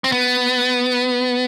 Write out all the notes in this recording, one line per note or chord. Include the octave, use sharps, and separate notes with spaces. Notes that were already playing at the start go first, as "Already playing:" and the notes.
C4
B3